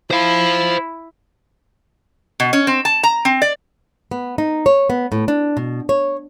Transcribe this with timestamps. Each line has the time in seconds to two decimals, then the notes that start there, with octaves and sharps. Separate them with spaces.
0.11 E4 C5 F5
2.40 B2
2.53 C#4
2.67 C4
2.85 A5
3.03 A#5
3.25 C4
3.42 D5
4.11 B3
4.38 D#4
4.66 C#5
4.90 B3
5.12 A2
5.28 D4
5.57 B2
5.89 C#5